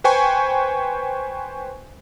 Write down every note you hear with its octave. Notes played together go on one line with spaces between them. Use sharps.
B4 C5 G5 G#5 C#6